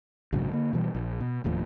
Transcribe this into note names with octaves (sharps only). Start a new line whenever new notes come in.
A#1 G#2 C#3 F#3
D3 A#3
B2 E3 G3
A#1
B2
E1 D#2 A2 F3